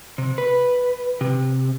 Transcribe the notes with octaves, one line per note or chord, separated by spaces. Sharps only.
C3
B4
C3